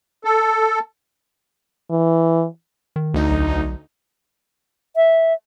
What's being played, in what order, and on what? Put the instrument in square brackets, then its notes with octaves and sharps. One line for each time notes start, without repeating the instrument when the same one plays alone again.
[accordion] A4
[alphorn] E3
[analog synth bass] D#3
[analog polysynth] D2 D#4
[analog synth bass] B1
[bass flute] E5